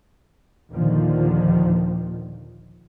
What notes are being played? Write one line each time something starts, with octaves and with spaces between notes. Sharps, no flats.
D#2 A#2 D3 D#3 F3